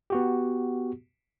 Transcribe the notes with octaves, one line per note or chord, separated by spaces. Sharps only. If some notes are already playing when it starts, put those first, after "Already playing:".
B3 F#4 G4